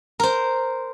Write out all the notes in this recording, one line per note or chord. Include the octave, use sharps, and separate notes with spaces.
A#4 C5